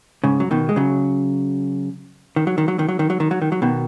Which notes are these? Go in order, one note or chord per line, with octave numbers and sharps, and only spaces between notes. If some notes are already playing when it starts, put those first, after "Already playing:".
G#2 C#3
F#3
B2 D#3
G#3
C#3 F#3
D#3
F#3
D#3
F#3
D#3
F#3
D#3
F#3
D#3
F#3
D#3
F#3
B2 D#3